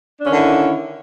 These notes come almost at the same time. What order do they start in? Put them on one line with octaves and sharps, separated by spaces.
D4 C#4 D#3 D3 E4